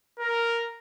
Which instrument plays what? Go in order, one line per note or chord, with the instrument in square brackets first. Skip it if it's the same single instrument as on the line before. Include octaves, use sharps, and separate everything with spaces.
[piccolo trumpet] A#4